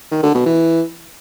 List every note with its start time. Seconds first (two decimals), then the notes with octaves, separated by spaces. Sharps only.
0.12 D#3
0.23 D3
0.35 B2
0.46 E3